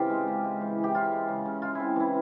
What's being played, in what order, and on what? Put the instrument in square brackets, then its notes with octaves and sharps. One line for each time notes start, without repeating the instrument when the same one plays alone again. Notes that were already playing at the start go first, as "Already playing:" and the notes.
Already playing: [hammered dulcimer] C#3 E3 C4 F4 G4
G#3
C#3
G#3
E3
E3
G4
C#3 F4
G#3
C#3
C#3
G#3 F4
C4 E4
E3 E4